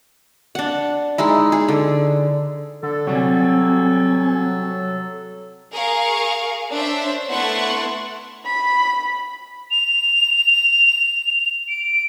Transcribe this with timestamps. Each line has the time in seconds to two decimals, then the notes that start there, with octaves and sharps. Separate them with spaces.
0.55 D4 F#5
1.18 G#3 D#4 E4
1.52 G#4
1.68 D3
2.83 D3 A4
3.07 C3 F#3 G3 C4 G#5
5.73 G#4 A#4 F5 C#6
6.73 D4 C5 C#5 E5
7.29 A3 B3 E4 F#5 C6 C#6
8.45 B5
9.71 F7
11.68 D7